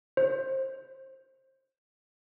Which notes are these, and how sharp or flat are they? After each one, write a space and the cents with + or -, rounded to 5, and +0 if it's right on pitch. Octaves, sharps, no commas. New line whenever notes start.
C5 +25